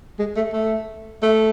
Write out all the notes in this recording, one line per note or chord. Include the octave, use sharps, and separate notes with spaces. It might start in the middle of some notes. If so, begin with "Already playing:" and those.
G#3
A3
A3
A3